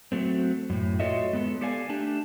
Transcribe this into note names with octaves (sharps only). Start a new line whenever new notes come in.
F#3 A3 C4
F#2 A2
F4 F#4 A4 C#5 D#5 E5
G#3 B3 A4
G4 A4 D5 F5 G#5
A3 D4 G4 A5